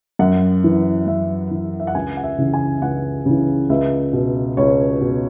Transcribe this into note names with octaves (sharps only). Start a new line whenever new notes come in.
F#2 F#5
E3
F#2 E5
E3
E5
F#5
C#2 G#5
F#5
E5
C#3 E3
G#5
C#2 F#5
C#3 E3
C#2 E5
B2
C#2 C#5
B2